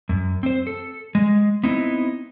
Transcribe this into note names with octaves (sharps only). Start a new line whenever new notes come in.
F#2
C4 C5
A4
G#3
B3 C4 D#4 E4